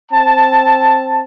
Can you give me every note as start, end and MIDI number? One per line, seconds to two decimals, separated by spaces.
0.11 1.22 60
0.11 1.22 81